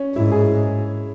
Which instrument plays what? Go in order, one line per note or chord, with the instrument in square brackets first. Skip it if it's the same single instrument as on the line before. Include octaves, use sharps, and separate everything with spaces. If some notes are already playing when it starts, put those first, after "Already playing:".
Already playing: [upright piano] C#4
[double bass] G#2 [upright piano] E4
[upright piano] G#4